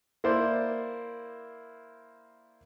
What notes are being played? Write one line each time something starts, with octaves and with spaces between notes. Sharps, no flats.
A#3 E4 C5 D5